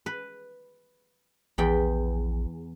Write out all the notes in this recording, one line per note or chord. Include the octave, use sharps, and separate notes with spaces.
B4
A#1 E2 G5 B5